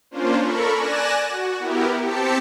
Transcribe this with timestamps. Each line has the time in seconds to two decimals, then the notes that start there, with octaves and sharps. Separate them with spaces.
0.11 A#3 C#4 D4 F4 C5
0.40 A4 A#4 B5 C#6
0.72 D5 G#5 F#6 A#6 E7
1.27 F#4
1.59 B3 E4 G4 A#4
2.01 C4 G4 A5 B6 C#7